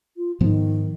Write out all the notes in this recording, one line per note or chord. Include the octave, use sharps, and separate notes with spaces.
F4
G#2 D#3 F3 B3